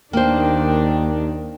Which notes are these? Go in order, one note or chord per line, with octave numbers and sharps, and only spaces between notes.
D#2 D#3 A#3 D4 C5 G5